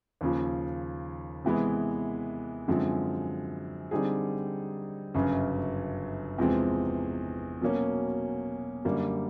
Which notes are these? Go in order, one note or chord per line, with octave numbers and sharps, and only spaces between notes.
D#2 C#3 F3
C3 E3 G#3 B3
F#2 D3 F3 G#3 C4
D3 G3 C4 D#4 G#4
G1 F#2 C#3
E2 C3 F3 G#3 C4
B2 F#3 A#3 C#4
F#2 D3 G3 A#3